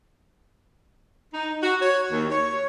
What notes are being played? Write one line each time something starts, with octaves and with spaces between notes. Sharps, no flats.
D#4
F#4
C#5
D#2
C#5